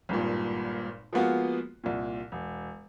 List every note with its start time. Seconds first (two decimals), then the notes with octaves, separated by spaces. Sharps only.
0.09 G#1 G2 A#2
1.13 F3 G#3 A#3 B3 F4 F#4
1.84 C2 A#2
2.32 E1